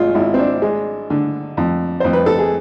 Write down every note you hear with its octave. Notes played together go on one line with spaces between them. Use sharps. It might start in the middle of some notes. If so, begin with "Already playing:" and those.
Already playing: G#1 F4 G#4
G#1 E4
C4
D4
G#3
D3
F2
F2 C5
B4
A4
G#4